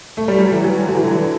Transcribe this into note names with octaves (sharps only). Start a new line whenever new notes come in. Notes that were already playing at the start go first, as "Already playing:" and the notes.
A3
G3
F#3
E3
F#3
D3
F#3
E3
D3
E3